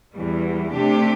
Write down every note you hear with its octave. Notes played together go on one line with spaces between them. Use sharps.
E2 E3 G3
C3 A3 D4 G4